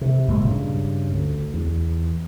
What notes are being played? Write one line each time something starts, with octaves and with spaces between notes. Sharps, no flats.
C3
F#1 A#2 G#3
G2 C#3
D2
E2